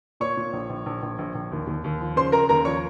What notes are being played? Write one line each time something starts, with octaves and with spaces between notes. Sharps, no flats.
A#2 C#5 C#6
A#2
A#1
A#1
A#1
A#1
A#1
A#1
D#2
D#2
D#2
F3
C#3 C5 C6
C#3 A#4 A#5
D#2 A#4 A#5
F3 C#5 C#6